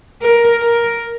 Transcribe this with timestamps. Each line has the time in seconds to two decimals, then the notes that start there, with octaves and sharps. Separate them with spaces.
0.21 A#4
0.61 A#4